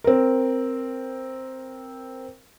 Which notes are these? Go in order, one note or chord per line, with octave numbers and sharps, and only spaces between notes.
C4 A#4